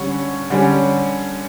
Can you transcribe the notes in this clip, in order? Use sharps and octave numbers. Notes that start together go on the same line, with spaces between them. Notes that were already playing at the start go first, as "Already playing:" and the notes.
Already playing: D3 G3 C#4 C#6
D3 G3 C#4